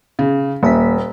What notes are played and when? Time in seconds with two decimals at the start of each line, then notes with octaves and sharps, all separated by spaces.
0.19 C#3
0.63 D#1 A#3 E5 B6